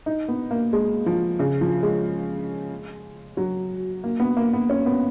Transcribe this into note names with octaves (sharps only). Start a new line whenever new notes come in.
D#4
B3
A#3
G#3
F3
C#3
F3
G#3
F#3
A#3
B3
A#3
B3
C#4
B3